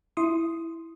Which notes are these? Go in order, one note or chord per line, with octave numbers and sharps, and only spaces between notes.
E4 C6 D#6